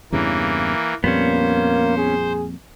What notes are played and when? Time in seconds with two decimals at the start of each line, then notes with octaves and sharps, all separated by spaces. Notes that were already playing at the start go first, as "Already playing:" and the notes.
0.12 E2 G2 C#3 E3 A#3
1.04 F2 A#2 G3 A#3 B3 C#4 C5
1.98 G#4